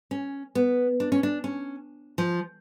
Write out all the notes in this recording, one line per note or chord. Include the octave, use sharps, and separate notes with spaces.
C#4
B3
D4
C#4
D4
C#4
F3